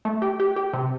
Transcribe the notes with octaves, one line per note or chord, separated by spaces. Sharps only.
A3
G4
G4
G4
C3